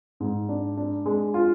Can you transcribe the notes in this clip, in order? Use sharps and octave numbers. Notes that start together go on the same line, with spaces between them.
G#2
D4
D4
G#3
F4